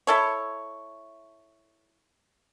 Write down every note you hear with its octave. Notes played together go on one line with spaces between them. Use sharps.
E4 A4 C#5